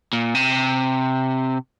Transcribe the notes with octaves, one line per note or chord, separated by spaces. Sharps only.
A#2
C3